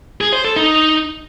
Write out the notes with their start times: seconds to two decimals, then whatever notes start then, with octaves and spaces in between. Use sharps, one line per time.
0.21 G#4
0.33 C5
0.45 A4
0.56 D#4